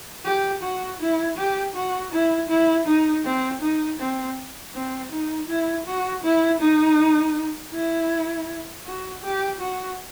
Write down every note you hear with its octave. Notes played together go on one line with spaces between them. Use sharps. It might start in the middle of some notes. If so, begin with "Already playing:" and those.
G4
F#4
E4
G4
F#4
E4
E4
D#4
C4
D#4
C4
C4
D#4
E4
F#4
E4
D#4
E4
F#4
G4
F#4